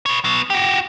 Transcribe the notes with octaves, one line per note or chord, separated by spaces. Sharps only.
B4 C#5
F#3 B3
F#4 G4